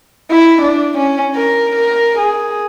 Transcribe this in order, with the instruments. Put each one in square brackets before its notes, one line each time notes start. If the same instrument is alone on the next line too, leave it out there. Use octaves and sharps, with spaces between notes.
[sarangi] E4
D4
C#4
A#4
A#4
G#4